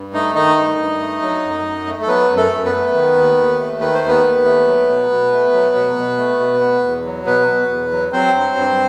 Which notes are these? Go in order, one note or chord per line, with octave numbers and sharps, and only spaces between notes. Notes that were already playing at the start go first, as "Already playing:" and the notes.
Already playing: G2
A3 D#4 D#5
D#3 D#4 D#5
G2
G2
A3
F#3
F#2
F#2
A3
A4
F#3 B3 B4
F#2
A3 A4
F#2
B3 B4
A3
D#3
D#2
D#2
A3
D#3 B4
C5
D#2
B3 B4
D#2
A3
F#3
B2
B2
A3
F#3
B2
B2
A3
B2
B3
E2
F#3
B2 B3 B4
B3
E2
F#3
F#3 C4 C5
G2
G2